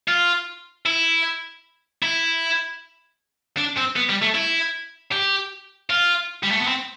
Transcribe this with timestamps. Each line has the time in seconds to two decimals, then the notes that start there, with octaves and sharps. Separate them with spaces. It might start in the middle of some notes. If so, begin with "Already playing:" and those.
0.08 F4
0.86 E4
2.02 E4
3.57 D4
3.77 C4
3.96 B3
4.09 G3
4.22 A3
4.34 E4
5.12 G4
5.90 F4
6.43 G3
6.51 A3
6.59 B3
6.67 C4